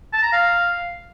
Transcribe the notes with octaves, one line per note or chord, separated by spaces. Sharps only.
A5
A#5
F5